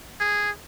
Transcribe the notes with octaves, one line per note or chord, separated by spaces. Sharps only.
G#4